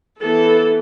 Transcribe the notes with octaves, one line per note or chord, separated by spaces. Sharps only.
E3 B3 A4